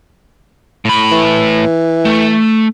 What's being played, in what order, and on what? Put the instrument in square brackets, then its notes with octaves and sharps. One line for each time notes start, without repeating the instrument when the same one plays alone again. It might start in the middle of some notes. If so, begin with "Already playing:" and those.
[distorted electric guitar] A2 B5
[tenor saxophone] E3
[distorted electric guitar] A3